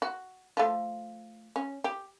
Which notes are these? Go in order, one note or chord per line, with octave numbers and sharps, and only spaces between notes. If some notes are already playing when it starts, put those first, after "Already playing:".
F#4
F3 A3
C#4
G4